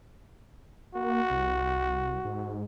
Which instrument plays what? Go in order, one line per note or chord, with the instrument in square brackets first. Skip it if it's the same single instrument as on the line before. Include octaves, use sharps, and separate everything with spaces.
[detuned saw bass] A#3 [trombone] F#4
[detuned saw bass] C2
G#2